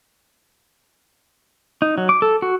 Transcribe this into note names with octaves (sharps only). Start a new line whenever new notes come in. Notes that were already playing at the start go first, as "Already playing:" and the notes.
D#4
F#3
D6
A4
F#4